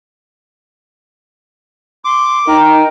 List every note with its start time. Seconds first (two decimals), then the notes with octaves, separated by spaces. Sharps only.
2.05 C6 D6
2.48 D#4 A#4 G5